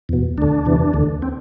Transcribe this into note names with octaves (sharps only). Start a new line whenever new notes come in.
E2 B2
D2 D3 D4
E2 C3 E3
D2 D3
C4